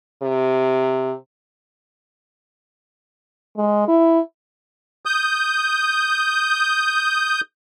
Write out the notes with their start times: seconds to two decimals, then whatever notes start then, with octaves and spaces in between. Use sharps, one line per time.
0.22 C3
3.57 G#3
3.88 E4
5.06 D#6 G6